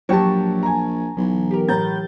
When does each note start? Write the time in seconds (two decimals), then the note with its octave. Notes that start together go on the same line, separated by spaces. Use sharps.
0.09 A#1 F#3 G4 A5 C#6
0.63 G#5 A#5
1.17 B1 E3 F#3
1.51 G4 A#4
1.69 A2 A#5 G6 A6